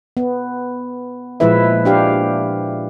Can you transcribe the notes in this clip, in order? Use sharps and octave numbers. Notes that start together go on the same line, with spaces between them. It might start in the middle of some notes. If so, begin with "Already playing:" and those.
B3
A#2 F3 G#3 E4 B4 E5
D4 G4 F5